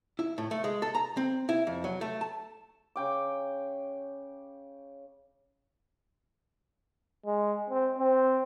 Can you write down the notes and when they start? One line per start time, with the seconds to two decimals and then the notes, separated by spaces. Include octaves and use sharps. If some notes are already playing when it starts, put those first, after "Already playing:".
0.19 E4
0.38 A2
0.51 A3
0.64 G#3
0.82 A4
0.95 A#5
1.17 C4
1.49 E4
1.67 F2
1.84 F#3
2.01 A3
2.21 A5
2.96 C#3 G5 D6
7.26 G#3
7.70 C4
7.98 C4